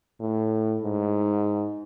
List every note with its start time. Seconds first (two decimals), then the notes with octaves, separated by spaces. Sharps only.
0.20 A2
0.82 G#2